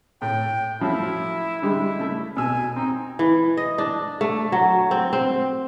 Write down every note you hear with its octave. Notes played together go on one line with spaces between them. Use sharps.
A2 G5
F3 F#3 A3 E4
D3 G3 G#3 E4
C#3 A3
B2 G#5 E6
C4 D#4
E3
D#5
D4
A3
F#3
C4
C4